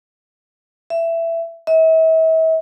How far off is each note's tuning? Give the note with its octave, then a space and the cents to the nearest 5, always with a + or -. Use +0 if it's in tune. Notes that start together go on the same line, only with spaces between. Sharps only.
E5 +15
E5 -40